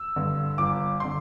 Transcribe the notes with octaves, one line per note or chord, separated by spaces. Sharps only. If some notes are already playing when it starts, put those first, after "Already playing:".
Already playing: E6
G2 D3
G1 D6
D3 C6